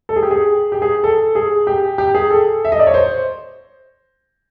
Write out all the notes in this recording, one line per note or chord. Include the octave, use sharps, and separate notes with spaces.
A4
G#4
G4
G#4
G4
G#4
A4
G#4
G4
G4
G#4
A4
E5
D#5
D5
C#5
C5